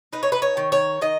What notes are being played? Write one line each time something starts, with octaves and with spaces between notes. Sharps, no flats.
D#4 B4
C#5
B4
C#5
D#3
C#5
D#3 D#5